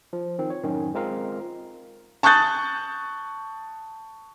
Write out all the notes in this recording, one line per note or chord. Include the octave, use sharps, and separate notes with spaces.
F3
D#3 C4
C#5
F#2 A2 D#3 C#4
G#3 C4 F4 A#4 F5
A5 C#6 D#6 F#6 G6 A6